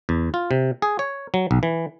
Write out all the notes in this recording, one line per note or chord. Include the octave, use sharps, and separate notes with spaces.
E2
F4
C3
G#4
C#5
F#3
B1
E3